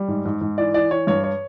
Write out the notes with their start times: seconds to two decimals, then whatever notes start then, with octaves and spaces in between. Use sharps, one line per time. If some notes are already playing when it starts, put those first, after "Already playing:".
Already playing: G3
0.08 G#2
0.25 G#2
0.41 G#2
0.58 E3 D5
0.74 E3 D5
0.91 E3 C#5
1.07 G2 C#5
1.24 C#5